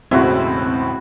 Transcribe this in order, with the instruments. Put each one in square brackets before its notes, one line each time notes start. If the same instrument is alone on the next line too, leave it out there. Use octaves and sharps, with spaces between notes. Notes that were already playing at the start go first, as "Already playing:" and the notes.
[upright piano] E1 A2 C#3 [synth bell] C4 [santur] E4 F#4